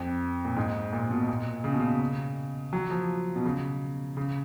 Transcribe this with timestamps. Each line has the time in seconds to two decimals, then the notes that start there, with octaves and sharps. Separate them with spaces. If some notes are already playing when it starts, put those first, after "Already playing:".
Already playing: F2
0.45 A#2
0.56 G#2
0.93 A#2
1.11 B2
1.29 A#2
1.64 C#3
1.72 B2
1.80 C#3
2.73 F#3
2.91 F3
3.36 B2
3.45 C#3
4.17 C#3